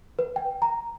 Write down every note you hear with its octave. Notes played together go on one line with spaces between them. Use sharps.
B4
G5
A#5